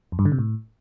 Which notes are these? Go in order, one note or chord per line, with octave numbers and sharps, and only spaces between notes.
F2
G2
D3
C3
A2